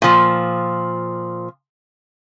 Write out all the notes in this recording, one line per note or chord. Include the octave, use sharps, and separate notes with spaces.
A#2 F3